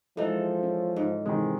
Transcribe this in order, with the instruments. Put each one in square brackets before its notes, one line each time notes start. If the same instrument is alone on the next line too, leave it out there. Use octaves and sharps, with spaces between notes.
[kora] E3 D#4 [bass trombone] F3 [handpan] G#3 A4
[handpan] C#4
[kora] G#2
[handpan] C3 E3 C4 [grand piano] D#3 G#3